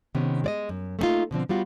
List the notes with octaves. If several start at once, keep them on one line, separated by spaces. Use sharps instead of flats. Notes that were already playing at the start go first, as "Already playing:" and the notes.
C3 D#3 B3 C#4
G#3 D5 D#5
F#2
A3 A#3 C4 D#4 F4
B2 D3 F3 C4
G3 B3 F4 F#4